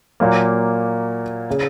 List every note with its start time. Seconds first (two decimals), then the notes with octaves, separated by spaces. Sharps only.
0.20 A#2 F#3 A#3
1.50 C#3